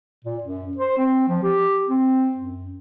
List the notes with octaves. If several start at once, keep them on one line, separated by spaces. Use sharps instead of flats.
A#2
F#2
C5
C4
F3
G4
C4
F#2